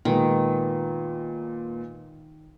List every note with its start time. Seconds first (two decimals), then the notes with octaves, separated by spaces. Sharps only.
0.05 A#2 D#3 G#3 B3